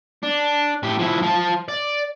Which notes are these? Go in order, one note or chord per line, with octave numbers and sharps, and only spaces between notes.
D4
A2 G4
F3 E4
F3 A5
D5